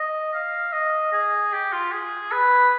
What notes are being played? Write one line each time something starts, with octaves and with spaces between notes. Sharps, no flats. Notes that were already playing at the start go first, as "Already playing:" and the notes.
Already playing: D#5
F5
D#5
G#4
G4
F4
G#4
B4